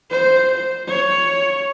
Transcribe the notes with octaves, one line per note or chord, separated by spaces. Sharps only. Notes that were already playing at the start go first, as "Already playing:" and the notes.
C5
C#5